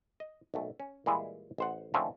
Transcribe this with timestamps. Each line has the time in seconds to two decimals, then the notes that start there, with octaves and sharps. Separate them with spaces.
0.20 D#5
0.54 B1 A#2 A3
0.80 C#4
1.06 A#2 E3 G3 G#3 E4 F4
1.58 A1 C5 F#5
1.94 D3 D#3 F3 A3 C4 C#4